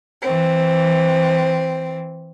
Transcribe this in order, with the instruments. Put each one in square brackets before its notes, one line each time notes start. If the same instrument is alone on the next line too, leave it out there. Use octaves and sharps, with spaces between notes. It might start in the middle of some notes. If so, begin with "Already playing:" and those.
[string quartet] E3 C4